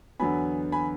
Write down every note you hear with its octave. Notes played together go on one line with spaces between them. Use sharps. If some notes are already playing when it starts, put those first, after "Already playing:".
E2 D3 F#3 B3 G#5 B5
G#5 B5